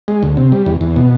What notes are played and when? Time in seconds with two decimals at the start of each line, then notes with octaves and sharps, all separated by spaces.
0.08 G#3
0.23 D2
0.37 C3
0.52 G3
0.66 E2
0.81 E2
0.96 B2